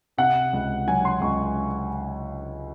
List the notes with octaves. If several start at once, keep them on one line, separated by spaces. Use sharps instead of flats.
C3 F#5
C#2
F#3 G#5
C6
C#2 C#6